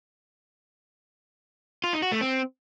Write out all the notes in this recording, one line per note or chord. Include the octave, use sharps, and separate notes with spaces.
F4
D#4
F#4
A3
C4